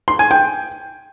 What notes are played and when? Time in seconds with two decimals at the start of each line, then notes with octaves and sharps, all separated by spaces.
0.08 C6
0.19 G#5
0.31 G5